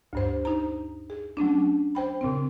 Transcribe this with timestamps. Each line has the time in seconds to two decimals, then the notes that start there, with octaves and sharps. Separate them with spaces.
0.13 D2 G2 C5
0.45 D#4 C5 A#5
1.10 G#4
1.37 F#3 A3 C#4 D4
1.95 C5 G5 B5
2.21 A#2 C#3 C4